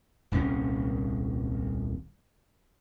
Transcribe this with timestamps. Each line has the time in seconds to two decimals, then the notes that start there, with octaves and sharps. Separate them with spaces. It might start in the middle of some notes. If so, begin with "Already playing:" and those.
0.32 D#1 C2 C#4